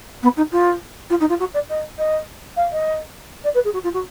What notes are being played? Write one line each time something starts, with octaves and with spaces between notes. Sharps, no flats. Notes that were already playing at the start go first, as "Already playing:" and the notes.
B3
D#4
F4
F4
D#4
F4
F#4
D5
D#5
D#5
F5
D#5
D5
B4
G#4
F#4
F4
F#4